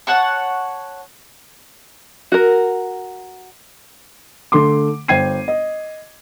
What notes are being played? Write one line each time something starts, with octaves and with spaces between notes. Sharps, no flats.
C#5 F#5 A5 C#6
F#4 A#4
D3 A3 C6 D6
G1 C5 G5 G#6 C7 D#7
D#5